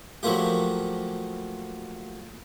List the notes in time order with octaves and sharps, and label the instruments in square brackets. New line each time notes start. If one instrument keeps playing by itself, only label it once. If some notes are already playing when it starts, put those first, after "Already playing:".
[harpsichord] F3 F#3 A3 A#3 F4 G4